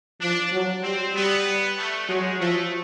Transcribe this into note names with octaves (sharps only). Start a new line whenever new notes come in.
F3 D4
F#3
G3 C4
G3 B3
A3
F#3 G#3
F3 A3